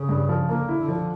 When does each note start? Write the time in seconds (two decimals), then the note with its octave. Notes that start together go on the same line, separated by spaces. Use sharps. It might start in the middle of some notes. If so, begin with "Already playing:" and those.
Already playing: C#3
0.09 G2
0.29 F3
0.48 D3 A#3
0.69 E4
0.79 D3
0.88 F3